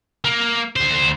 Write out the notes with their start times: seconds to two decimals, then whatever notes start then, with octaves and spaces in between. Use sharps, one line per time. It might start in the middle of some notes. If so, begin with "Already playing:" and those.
0.25 A#3
0.76 D2 C5